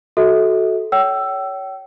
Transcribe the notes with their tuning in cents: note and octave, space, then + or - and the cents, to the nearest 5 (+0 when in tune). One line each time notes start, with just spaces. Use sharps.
F#4 +0 A4 -15 E5 -40
C#5 +20 G5 -40 E6 +10